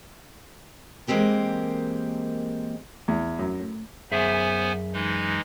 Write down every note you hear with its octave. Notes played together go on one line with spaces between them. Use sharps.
E3 G#3 A#3 C4 G4 A#4
E2
F#2
A2
F#2 B3 G#4 C5 E5 G#5
E3 G#3 D#4